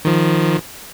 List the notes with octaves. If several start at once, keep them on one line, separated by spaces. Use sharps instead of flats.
D#3 F3